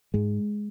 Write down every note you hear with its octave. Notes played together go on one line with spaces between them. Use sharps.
G#2 G#3